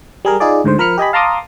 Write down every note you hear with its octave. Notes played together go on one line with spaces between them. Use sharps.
G3 G#4 A#4
D#4 F4 G#4 D5
D2 G#2 D3 C5
F3 A#4 B5 F6 C#7
G4 D#5 G#5 B5
F5 A5 A#5 C6 D6 D#6